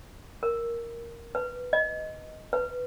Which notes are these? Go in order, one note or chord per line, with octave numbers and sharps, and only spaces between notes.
A#4
B4
D#5
B4